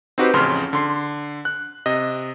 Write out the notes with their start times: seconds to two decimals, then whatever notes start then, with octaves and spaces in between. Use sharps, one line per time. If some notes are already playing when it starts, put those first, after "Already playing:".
0.18 C4 D#4 F#4 G4 B4 C5
0.33 A1 F2 C#3 C6 F6
0.73 D3 C6 C7
1.45 F#6
1.86 C3 D#5